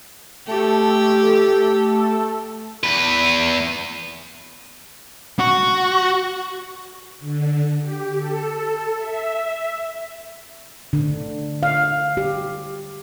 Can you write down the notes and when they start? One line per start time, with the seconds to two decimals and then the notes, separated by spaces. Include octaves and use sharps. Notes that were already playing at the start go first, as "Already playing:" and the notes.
0.47 A3 G4 A4
2.84 E2 B4
5.39 F#4
7.20 D3
7.81 G4
8.17 A4
8.98 E5
10.93 D3
11.63 F5
12.17 G4